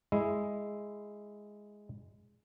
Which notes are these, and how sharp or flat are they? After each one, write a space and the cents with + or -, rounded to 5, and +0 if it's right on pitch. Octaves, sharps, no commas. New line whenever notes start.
G#3 +0 E4 +0